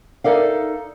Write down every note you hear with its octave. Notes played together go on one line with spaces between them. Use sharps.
D#4 A4 A#4 D5 E5 F5